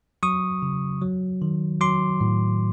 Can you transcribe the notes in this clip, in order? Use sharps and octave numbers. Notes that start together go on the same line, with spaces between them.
F#3 C#6 D#6
C#3
F#3
D#3
F#3 C6 D6
A2